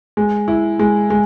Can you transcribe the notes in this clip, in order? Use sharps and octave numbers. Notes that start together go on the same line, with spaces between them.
G#3
E4
G#3
G#3